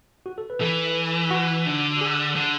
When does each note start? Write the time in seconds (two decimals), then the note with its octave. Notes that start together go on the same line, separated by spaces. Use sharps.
0.26 F#4
0.38 A4
0.50 B4
0.61 E3 A4
1.31 F#4
1.66 D3
2.01 G#4
2.36 D3